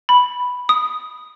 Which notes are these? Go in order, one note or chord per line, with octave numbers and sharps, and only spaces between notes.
B5
D#6